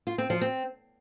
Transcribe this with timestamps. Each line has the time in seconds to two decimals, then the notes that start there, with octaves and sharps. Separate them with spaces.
0.07 F4
0.18 C4
0.30 F3
0.41 C4